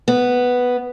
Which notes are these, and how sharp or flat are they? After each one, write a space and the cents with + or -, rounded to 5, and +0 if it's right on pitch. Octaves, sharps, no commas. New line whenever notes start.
B3 +0